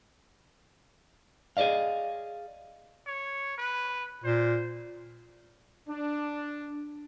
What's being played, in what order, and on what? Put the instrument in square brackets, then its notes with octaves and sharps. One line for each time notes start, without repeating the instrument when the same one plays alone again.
[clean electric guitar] G#4 A4 D5 D#5 F5
[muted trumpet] C#5
B4
[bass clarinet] A#2 [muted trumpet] C5
[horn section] D4